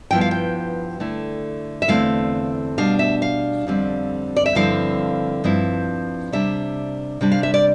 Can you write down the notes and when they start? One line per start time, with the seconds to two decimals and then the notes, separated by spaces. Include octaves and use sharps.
0.11 G2 F3 B3 E4 G5
0.21 F5
0.31 G5
1.00 D3 A3 E4
1.82 E5
1.88 E2 D3 A3 C4 E4 F5
2.78 B2 G3 D4 F5
2.99 E5
3.22 F5
3.67 F2 D3 G3 C4
4.37 D5
4.46 E5
4.55 G2 D3 F3 C4 E4 F5
5.44 G2 F3 C4 E4
6.32 C3 G3 D4 E5
7.21 C3 G3 D4
7.32 F5
7.43 E5
7.54 D5